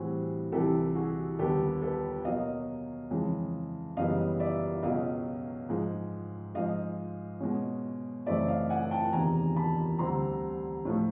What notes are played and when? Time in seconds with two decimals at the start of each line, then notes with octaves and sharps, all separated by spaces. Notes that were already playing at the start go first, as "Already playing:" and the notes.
Already playing: A2 E3 G3 C4 F#4 G#4
0.52 C2 C3 E3 G4 A4
0.95 F#4 G#4
1.39 D#2 D3 G3 B3 G4 A4
1.81 A4 B4
2.25 B2 F#3 A#3 D#5 F5
3.10 F2 C#3 E3 G#3
3.97 F#2 C#3 E3 G3 B3 D#5 F5
4.40 D5 E5
4.83 C#2 B2 F#3 D#5 F5
5.69 G#2 F3 G#3
6.54 G#2 F3 G#3 D#5 F5
7.40 B2 G#3 C#4
8.26 F#2 C#3 E3 A3 C4 D5 E5
8.48 D#5 F5
8.70 F#5 G#5
8.91 G5 A5
9.13 E2 C3 D#3 G#5 A#5
9.56 A5 B5
9.99 D2 D3 G3 C4 A#5 C6
10.85 A2 F3 A3